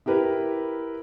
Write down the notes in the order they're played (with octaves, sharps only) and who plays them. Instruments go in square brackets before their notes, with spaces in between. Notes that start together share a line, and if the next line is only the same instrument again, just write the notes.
[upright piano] E4 G4 A#4 B4